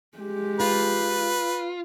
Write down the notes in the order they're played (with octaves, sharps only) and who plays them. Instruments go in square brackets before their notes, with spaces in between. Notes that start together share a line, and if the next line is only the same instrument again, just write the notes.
[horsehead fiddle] G#3 G4
[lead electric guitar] F4 [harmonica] B4